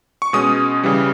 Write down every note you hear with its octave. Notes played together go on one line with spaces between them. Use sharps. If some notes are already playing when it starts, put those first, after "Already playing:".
C#6
B2 G#3 C#4 D#6
C#3 E3 G3